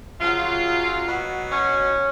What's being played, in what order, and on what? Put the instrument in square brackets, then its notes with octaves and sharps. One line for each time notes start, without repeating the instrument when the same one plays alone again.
[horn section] F#2 C#3 F#3 F4
B2 F#3
C#4